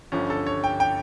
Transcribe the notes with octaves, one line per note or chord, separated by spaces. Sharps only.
G1 G2 D3 F3 C#4
A4
C#5
G5
G5